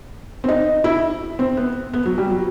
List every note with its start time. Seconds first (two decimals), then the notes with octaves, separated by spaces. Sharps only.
0.44 C4
0.49 D#4
0.84 E4
1.39 C4
1.57 B3
1.93 B3
2.06 F#3
2.18 G3
2.30 F#3